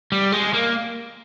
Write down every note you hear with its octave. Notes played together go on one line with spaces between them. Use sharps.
G3
G#3
A#3